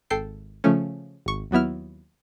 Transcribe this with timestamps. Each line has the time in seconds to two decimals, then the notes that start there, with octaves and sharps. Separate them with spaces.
0.10 G#1 A4 G5 C7
0.64 C#3 F3 A3 C#4
1.26 G#1 C#6
1.51 D#2 F#3 B3 E4 F6